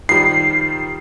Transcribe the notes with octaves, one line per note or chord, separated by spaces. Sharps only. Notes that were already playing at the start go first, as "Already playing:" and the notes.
D#3 F3 G3 C7